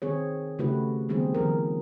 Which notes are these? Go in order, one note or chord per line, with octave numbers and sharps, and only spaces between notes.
D#3 C4 G#4 C#5
C#3 A3 E4 F#4 G4 B4
D#3 G3 B3 C4 D4 G#4
D#3 F3 A#4